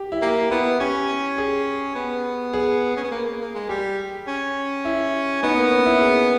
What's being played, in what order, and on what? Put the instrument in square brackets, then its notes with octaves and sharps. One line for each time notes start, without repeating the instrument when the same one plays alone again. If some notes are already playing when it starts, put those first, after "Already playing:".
Already playing: [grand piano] G4
E4
[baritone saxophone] A#3 [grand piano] G4
[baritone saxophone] B3 [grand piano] E4
[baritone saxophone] C#4 [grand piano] G4
[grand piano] G#4
[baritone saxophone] B3
[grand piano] G#4
[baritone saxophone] C#4
B3
A#3
A#3
A#3
G#3
[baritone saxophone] G3 [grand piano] G4
[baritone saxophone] C#4
[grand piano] E4
[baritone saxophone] B3 [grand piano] D#4
[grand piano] A#3
C#4
E4
G#4